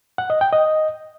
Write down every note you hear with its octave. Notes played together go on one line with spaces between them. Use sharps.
F#5
D#5
G5
D#5